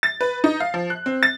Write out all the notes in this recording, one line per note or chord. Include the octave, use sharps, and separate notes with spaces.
A6
B4
D#4
F5
F3
F#6
C4
A6